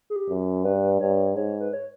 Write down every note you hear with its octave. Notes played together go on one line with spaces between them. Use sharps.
G#4
G4
F#2
G2 B4
G2 C#5
G#2 C#5
B4
C#5